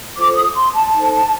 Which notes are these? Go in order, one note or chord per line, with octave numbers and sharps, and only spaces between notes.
F4 A4 C5 D6
D#6
C6
A5
D#4 A4 C5